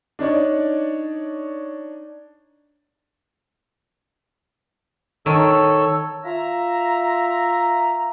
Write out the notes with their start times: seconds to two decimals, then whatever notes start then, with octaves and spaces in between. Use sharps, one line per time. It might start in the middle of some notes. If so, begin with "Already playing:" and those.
0.19 D4 D#4 C#5 D5
5.26 D#3 A4 C#5 E6
6.24 F4 E5 A#5